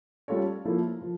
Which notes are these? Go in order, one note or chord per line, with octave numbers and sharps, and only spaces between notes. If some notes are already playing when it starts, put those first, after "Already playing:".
G3 C#4 F4 A4 C#5
F3 A#3 E4 A4
F3